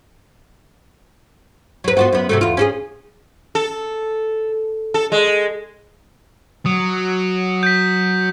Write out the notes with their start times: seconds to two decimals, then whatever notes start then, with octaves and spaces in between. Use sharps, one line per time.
1.84 F#3 B4
1.97 B3 F4 F#4
2.12 F#2 B3
2.29 C3 F#3 A3
2.41 E2 F4
2.57 C#4 F#4 G#4
3.55 A4
4.94 A4
5.12 G#3
6.66 F#3 D#6
7.63 G6 B6